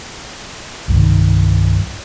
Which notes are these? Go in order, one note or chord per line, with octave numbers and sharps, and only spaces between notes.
C2 G2 D#3